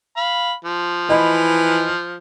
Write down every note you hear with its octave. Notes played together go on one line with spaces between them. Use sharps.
F5 B5
F3
E3 D#5 B5